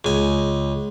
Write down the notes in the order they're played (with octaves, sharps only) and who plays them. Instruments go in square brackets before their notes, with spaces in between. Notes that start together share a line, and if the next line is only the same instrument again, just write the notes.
[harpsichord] C#2 G#5